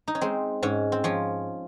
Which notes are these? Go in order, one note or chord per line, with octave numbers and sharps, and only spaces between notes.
D#4
C#4
G#3 C4
G#2 C#4
C4
F3 C#4